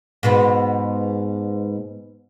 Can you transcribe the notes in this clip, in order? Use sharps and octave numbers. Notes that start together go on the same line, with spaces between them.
G#2 B2 B3